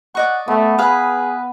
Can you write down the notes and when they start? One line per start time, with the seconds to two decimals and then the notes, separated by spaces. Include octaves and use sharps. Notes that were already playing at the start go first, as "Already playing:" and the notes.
0.15 D5 D#5 F#5 C#6
0.48 A3 B3
0.79 G#4 B4 F5